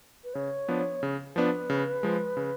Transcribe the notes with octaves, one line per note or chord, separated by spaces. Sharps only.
B4
C#3 C#5
F3 B3 D4
C#3
F3 B3 D4 B4
C#3
F3 G#3
C#3